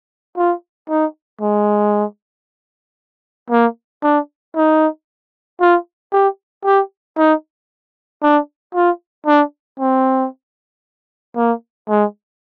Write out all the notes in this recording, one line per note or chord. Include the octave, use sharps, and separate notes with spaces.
F4
D#4
G#3
A#3
D4
D#4
F4
G4
G4
D#4
D4
F4
D4
C4
A#3
G#3